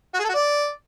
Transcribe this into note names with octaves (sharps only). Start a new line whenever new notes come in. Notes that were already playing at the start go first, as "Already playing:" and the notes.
F#4
G#4
A4
F#4
D5